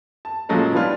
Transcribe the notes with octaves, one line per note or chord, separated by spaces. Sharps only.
A5
A#2 C#3 F3 F#3 G#3 A3
E3 F3 G3 B3 D4 F4